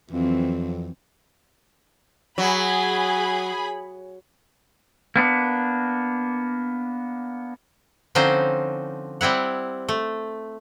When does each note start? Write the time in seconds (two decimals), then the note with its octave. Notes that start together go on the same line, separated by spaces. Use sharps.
0.11 F2 E3 F#3 C4
2.38 F#3 G#4 B5
5.16 A#3 B3 D4
8.15 D3 F3 C4 C#4 D#4 C5
9.21 G3 C4 E4 F#5
9.89 A3